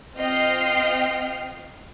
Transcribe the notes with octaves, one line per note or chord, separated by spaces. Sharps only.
C4 F4 D#5 G5 F6 C7